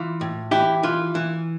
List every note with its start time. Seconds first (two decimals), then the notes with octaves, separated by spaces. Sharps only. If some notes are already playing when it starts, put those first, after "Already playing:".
Already playing: E3 F4
0.21 A2
0.51 E3 E4 G4
0.83 E3 F4
1.15 E3